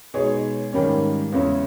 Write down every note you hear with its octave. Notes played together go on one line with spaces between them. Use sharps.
B2 G#3 D#4 G#4 C#5
G#2 D#3 G3 A#3 C#4
E2 C#3 G#3 C#4 E4